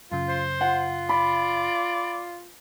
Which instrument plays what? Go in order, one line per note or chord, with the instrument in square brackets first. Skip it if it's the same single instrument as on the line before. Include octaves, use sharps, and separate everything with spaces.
[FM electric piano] F#2 C#3 [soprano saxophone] F4
[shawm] C5
[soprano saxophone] F4 [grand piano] F#5
[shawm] D5 [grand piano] B5